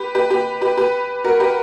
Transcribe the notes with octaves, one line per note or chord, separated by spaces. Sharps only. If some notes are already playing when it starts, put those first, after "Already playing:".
Already playing: G4 B4
G4 B4
G4 B4
G4 B4
G4 B4
F#4 A#4
G4 B4